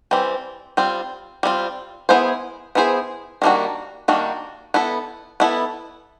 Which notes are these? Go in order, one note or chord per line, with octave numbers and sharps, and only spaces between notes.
E3 G3 C4
G3 C4 F4
G3 C4 F4
B3 E4 G#4 C5
B3 E4 G#4 C5
D#3 G3 A#3 D4 F#4
D#3 G3 A#3 D4 F#4
B3 E4 A4
B3 E4 A4